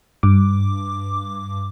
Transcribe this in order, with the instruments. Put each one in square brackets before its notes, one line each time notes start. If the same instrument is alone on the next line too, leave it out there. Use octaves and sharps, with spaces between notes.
[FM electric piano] G2 D6